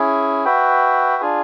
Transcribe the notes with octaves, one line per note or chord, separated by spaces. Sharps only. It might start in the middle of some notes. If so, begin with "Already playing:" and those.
Already playing: C#4 E4 G#4
F#4 B4 E5 G5
D4 F4 G#4